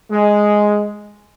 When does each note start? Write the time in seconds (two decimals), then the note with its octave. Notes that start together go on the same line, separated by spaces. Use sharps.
0.11 G#3